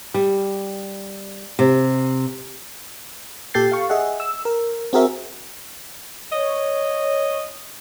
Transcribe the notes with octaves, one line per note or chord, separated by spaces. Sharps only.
G3
C3
A#2 G4 A4 G6 A6 C7
F5 C#6
G#4 D#5 E5 F#5
E6
A#4
C4 F#4 G#4 A#4 E5
C#5 D#5